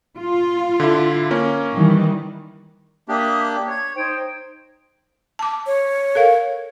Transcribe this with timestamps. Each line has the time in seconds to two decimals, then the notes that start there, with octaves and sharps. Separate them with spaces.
0.17 F4
0.80 D3 E4
1.31 A#3 C#4
1.74 D#3 E3 G3
3.08 A#3 D4 G4 E5 D#6
3.67 C#5 G#6
3.95 D#4 C5 G5
5.39 A5 D6
5.66 C#5
6.15 A4 A#4 F5